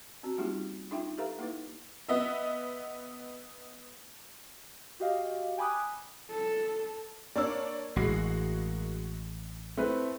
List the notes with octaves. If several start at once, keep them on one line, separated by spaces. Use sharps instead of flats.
C4 C#4 F#4
G3 A#3 D#4 F4 G4
D4 D#4 F4 E5 G5
G4 A4 B4 E5 F5 A#5
A#3 D#4 E4 B4
B3 D#5 E5
F#4 G4 D#5 F5
G5 G#5 B5 D6 D#6 F#6
A4
A#3 D4 C#5 D5 E6
A1 G#3 F#4 C7
A3 C4 E4 B4